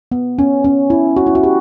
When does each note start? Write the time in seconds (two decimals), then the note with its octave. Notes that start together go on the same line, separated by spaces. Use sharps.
0.12 B3
0.39 C#4
0.64 C#4
0.90 E4
1.16 F#4
1.27 E4
1.35 F#4
1.43 G4